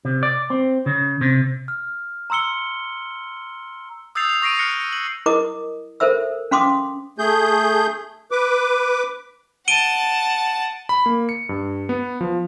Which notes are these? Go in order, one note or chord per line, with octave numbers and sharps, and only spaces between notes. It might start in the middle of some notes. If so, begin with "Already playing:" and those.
C3
D5
C4
C#3
C3
F6
A#5 C6 E6 C#7 G7
D#6 E6 G6 A6 C7 F7
F7
C#6 A#6 C7 D7 D#7
F6 F#6 A#6 C#7 D7
F#7
E4 A#4 D#5 D6 D#6
A4 A#4 C5 E5 E6
C#4 F5 C6 D6 D#6
A3 G#4 G6
B4 D6
F#5 A5 D7 D#7 G7
B5
A#3
C#7
G2
B3
F3